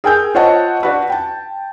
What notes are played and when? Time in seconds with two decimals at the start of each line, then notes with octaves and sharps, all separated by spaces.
0.04 G#4 A#4 G5 G#5 E6 G6
0.35 F4 C5 C#5 D#5 F#5 A5
0.83 D4 F#4 B4
1.10 G5 A5